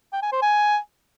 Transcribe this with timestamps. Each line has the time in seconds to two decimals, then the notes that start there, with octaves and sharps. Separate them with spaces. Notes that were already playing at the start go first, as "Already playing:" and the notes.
0.13 G5
0.22 G#5
0.32 C5
0.42 G#5